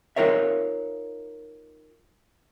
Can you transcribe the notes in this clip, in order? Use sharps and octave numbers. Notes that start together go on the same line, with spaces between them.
D#4 F4 A#4 C#5 E5